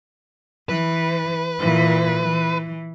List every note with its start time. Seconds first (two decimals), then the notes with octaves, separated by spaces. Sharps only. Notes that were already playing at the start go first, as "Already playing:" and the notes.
0.69 E3 B4
1.59 A#2 E3
2.22 E3